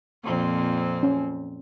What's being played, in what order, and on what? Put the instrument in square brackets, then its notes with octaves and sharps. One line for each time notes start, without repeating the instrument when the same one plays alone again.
[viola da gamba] F2 A#2 C4
[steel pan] C#4